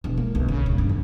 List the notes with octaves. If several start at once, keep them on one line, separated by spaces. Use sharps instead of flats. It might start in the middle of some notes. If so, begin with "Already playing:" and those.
E1
A#3
B1
C#3
D2
G2
F2